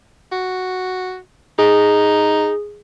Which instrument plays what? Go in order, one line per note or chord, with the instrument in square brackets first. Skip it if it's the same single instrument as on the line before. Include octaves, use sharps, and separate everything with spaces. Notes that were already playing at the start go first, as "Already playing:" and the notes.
[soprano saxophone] F#4
[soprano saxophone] D#4 [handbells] G#4